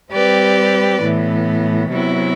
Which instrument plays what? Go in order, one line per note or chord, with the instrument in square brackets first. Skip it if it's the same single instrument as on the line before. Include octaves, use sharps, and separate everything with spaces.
[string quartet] G3 C4 G4 B4 D5
A2 E3 B3
C3 F#3 B3 E4